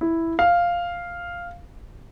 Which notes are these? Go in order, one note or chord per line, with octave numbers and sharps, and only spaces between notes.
E4
F5